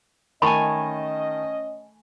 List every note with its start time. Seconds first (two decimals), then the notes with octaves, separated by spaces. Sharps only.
0.42 D#3 A3 C#4 D#5 G#5 A5 B5 C#6